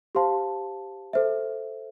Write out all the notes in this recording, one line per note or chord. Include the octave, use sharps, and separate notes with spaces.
G4 C5 F5 A5 C6
A4 C5 E5